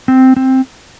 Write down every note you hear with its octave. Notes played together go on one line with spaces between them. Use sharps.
C4
C4